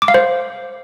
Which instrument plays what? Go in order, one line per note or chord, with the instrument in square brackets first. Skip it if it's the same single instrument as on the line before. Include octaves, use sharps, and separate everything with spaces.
[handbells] D6
F5
C5